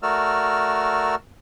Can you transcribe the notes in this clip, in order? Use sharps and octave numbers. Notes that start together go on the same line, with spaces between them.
A3 F#4 A#4 D5 E6 F6